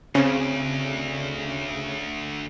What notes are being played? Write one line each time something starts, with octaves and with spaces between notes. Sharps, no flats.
D2 C#3 C4